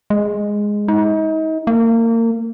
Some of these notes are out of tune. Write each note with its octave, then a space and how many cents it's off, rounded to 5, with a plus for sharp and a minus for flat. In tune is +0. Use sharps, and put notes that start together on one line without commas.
G#3 -5
D#4 +35
A#3 -30